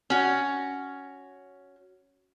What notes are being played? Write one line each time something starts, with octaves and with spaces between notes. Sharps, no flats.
C#4 F#4